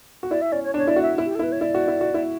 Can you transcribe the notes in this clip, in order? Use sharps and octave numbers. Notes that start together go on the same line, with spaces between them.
F#4
E4 D5
E5
C#4 D5
C#5
D4
C#5
E4 D5
F#4
E5
E4
G4
A4
E4
B4
C#5
E4 D5
F#4
E4
F#4
E4